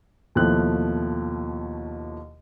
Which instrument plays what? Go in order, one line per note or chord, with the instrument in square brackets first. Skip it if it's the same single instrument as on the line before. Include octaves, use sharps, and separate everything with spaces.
[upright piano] D#2 B2 F3 A3 E4 F#6